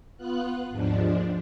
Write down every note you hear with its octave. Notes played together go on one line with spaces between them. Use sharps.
B3 F4 F#6
D#2 G#2 F3 D4